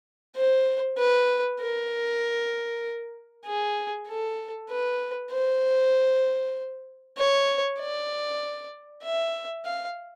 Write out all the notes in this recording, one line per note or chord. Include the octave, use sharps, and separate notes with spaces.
C5
B4
A#4
G#4
A4
B4
C5
C#5
D5
E5
F5